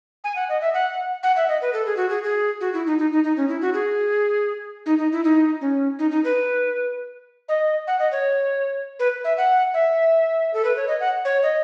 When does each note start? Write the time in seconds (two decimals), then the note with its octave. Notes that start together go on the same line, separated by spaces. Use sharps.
0.24 G#5
0.36 F#5
0.49 D#5
0.61 E5
0.74 F#5
1.23 F#5
1.36 E5
1.48 D#5
1.62 B4
1.73 A4
1.86 G#4
1.97 F#4
2.09 G#4
2.24 G#4
2.61 F#4
2.74 E4
2.86 D#4
2.98 D#4
3.12 D#4
3.24 D#4
3.37 C#4
3.48 E4
3.61 F#4
3.74 G#4
4.86 D#4
4.98 D#4
5.12 E4
5.24 D#4
5.61 C#4
5.99 D#4
6.11 D#4
6.24 B4
7.49 D#5
7.87 F#5
7.99 D#5
8.12 C#5
8.99 B4
9.24 E5
9.37 F#5
9.74 E5
10.54 A4
10.64 B4
10.76 C#5
10.88 D#5
11.00 F#5
11.25 C#5
11.43 D#5